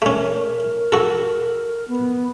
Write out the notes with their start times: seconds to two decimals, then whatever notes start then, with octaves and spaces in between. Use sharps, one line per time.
0.02 A3 C#4 A#4
0.92 F#4 A4
1.88 B3